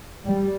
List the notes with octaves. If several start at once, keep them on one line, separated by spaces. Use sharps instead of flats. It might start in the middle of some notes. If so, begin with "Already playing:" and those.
G3